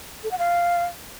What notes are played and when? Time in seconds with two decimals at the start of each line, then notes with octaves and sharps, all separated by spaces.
0.24 A4
0.31 F#5
0.39 F5